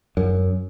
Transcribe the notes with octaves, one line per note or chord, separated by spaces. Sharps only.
F#2